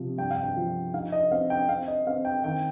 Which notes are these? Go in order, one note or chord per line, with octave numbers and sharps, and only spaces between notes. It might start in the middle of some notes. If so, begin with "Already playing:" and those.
Already playing: C3 F3
G2 G5
F5
G5
F3
D#4 F5
D#5
C4 F5
G5
C4 F5
D#5
C4 F5
G5
D#3 G5